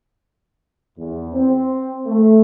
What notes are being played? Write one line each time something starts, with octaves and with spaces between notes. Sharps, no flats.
E2
C4
A3